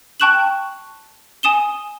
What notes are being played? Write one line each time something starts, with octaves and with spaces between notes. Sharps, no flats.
G5 A5 C#6 F#6 E7 F#7
G#5 D#6 E7 G7